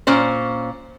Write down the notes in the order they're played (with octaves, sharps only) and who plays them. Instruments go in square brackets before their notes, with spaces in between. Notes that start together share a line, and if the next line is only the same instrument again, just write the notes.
[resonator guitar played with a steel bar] A#2 C#4 C5